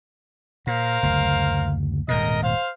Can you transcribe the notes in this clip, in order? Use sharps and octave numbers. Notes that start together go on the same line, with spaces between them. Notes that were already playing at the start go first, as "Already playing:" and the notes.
A#2 A#4 C5 F5
F#1 D2
D#1 G#2 B2 A#4 D#5
C5 F5